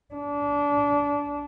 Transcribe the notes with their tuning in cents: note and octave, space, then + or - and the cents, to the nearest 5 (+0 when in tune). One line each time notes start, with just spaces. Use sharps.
D4 -25